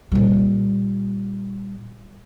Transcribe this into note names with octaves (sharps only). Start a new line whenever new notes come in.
A#2 G3